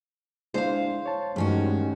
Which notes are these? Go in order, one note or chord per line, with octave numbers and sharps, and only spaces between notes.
G#3 D4 E4 C5 F5
C#5 A5
G2 D#3 E3 G#3 A3 C#4 F#4